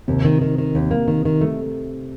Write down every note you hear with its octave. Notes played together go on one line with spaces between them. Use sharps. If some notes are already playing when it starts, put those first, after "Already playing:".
D#2 C3
D#3
D#3
D#3
D#2
A#3
D#3
D#3
A3